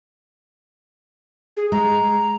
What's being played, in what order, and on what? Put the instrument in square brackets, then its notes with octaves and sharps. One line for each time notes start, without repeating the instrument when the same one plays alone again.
[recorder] G#4
[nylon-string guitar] G#3 [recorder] A#5